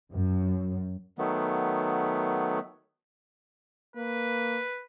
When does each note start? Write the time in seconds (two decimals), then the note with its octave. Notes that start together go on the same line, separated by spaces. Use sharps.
0.12 F#2
1.18 D#3 F#3 A3 B3
3.96 A#3 B4